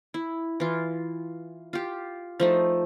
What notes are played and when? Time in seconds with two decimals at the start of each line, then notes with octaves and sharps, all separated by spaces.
0.14 E4
0.60 E3 F4
1.73 F4 G4
2.40 F3 A3 D#4